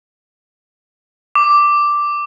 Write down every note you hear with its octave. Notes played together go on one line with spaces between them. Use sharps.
D6